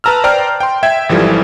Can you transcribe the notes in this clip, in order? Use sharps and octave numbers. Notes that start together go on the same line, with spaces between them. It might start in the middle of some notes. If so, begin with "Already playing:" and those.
B4 A5 A#5 E6 F6
C5 D5 G5 A#5 F6
G5 C6
E5 G5 G#6
G#1 E3 F3 G3 A4